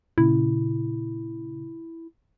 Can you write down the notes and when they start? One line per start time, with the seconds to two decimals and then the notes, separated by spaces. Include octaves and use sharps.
0.18 A#2 C#3 E4